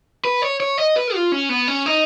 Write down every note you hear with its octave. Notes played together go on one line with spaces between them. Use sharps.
B4
C#5
C#5
D#5
B4
F4
C#4
B3
C#4
D#4